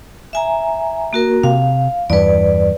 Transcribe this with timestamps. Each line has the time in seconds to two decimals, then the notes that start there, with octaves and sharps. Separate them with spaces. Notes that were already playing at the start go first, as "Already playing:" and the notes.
0.33 E5 G#5 A#5
1.13 A#3 F#4 A#4
1.43 C3 F5
2.10 E2 G2 B4 D5